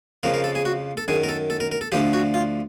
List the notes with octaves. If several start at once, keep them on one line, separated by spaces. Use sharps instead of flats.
F2 C#3 F3 A#4
A#4
A4
G#4
F#4
A4
F#2 D#3 G#4
A#4
A4
A4
A#4
A#4
A4
D2 D3 F3 G4
F#4
F4